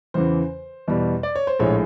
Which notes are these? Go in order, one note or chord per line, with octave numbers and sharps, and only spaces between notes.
E2 C#3 E3 C5
E2 B2 G3
D5
C#5
C5
A#1 A2 F3 G#3 C#5